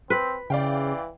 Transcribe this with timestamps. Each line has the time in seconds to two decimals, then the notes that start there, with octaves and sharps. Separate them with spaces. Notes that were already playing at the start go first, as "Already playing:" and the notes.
0.10 C4 B4
0.50 C#3 E3 D5 F5 G5